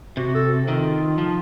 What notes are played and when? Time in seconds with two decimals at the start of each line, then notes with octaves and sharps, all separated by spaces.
0.17 C3 F#4
0.35 A4
0.68 D#3 F4
1.18 F3